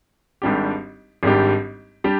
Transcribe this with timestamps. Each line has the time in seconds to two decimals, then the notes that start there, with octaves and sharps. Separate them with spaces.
0.42 G#1 G#2 G3 D4 G4
1.23 G#1 G#2 G3 D4 G4
2.04 G3 D4 G4